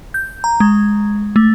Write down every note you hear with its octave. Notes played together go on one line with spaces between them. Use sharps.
G6
A#5
G#3
A3